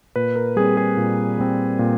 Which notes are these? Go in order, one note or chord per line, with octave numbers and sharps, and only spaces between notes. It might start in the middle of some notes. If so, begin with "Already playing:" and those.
A#2 B4
A#4
G3 C4 G#4
G#4
A#2
G3 C4
A#2